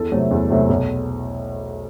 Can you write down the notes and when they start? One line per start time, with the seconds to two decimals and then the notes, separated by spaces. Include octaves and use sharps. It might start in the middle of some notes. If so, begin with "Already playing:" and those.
Already playing: E2 A4
0.12 C3 F#3 A3
0.31 E2
0.50 C3 F#3 A3
0.69 B1